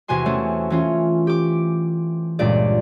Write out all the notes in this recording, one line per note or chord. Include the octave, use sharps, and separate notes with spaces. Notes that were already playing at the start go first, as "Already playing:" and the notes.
E2 C3 F#4 G#5 C6
A3 C4 C#4
E3 C#4 F4
G4 D6
C#2 G2 A#2 D5